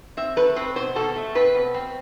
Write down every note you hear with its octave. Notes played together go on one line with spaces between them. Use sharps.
C4 E5
A3 B4
C4 B4
B2 C5
B2 A4
A3
C4 B4
B2
C4